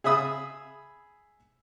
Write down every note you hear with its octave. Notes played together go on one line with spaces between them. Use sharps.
G#4 E5 B5 D#6 E6